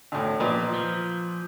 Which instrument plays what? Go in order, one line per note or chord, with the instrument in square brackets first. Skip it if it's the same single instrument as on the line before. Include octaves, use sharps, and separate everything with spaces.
[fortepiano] D2 A2
[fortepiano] A#2 B4 D#5 [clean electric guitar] F3
[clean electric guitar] F3